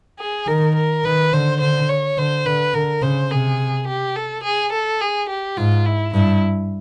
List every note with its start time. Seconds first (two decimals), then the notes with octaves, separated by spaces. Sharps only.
0.19 G#4
0.47 D#3 A#4
0.75 A#4
1.04 D#3 B4
1.33 D3 C5
1.61 D3 C5
1.89 C#5
2.17 D3 C5
2.46 D3 B4
2.74 D3 A#4
3.02 C#3 C5
3.30 C3 G#4
3.87 G4
4.16 A4
4.44 G#4
4.73 A4
5.01 G#4
5.29 G4
5.57 G#2 F4
5.86 E4
6.14 G2 E4